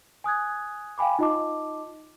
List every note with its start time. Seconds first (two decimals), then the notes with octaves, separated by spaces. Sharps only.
0.24 G#5 D#6 F#6 G#6
0.98 F5 G5 G#5 B5 D6
1.19 D#4 F4 D#5 A5 D6